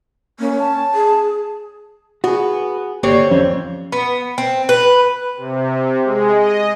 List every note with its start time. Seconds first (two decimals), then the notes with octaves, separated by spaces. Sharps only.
0.39 A#3 C#4
0.59 A5
0.94 G#4
2.24 B3 F#4 G#4
3.03 G#1 D3 A#3 C4 G4 C#5
3.31 F2 C#4
3.92 B3
4.38 C4
4.69 B4
5.37 C3
6.04 G#3
6.37 D#5